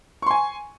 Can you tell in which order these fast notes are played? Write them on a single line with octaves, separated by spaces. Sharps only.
C#6 C6 G#5